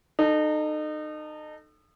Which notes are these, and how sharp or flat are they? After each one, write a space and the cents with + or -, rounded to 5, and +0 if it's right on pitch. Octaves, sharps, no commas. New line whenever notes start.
D#4 -30 A4 +0